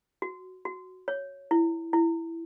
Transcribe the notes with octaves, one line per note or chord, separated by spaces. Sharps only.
F#4
F#4
C#5
E4
E4